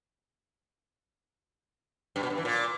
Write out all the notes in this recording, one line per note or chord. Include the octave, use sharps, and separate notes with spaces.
G2
B2
G2
E3
A#2